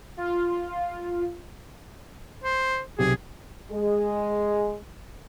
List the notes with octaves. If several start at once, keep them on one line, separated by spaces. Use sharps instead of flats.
F4
C5
B1 C3 G4 G#4
G#3 G#4